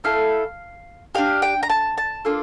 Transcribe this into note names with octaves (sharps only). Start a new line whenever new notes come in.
A3 E4 A4 F5
D4 G4 F5
G5
A#5
A5
A5
A#3 D4 F4 A4